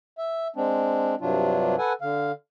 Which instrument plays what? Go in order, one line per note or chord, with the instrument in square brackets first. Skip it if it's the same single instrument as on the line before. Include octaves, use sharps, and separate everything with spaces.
[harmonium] E5
G#3 C4 D4
G2 C3 F#3 D4 F4
A4 B4 F#5 G#5
D3 F5